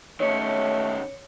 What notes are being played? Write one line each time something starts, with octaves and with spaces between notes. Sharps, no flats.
D#3 A3 C#4 C#5 C#7